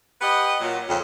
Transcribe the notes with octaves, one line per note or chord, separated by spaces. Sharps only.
G4 B4 D#5 F#5
A#2 F#3
F2 C#3